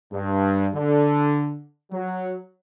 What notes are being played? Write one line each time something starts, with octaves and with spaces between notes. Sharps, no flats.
G2
D3
F#3